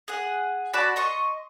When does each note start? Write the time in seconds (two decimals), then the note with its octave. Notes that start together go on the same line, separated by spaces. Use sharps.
0.08 G#4 F#5
0.73 F#4 D5 A5 B5
0.96 D#5 C6 C#6